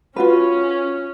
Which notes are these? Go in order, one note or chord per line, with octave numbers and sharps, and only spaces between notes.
C#4 F4 F#4 B4